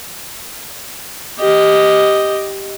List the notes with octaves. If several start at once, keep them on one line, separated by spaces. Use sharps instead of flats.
G4 D#5